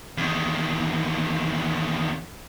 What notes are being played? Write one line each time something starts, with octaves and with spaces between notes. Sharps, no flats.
E2 D#3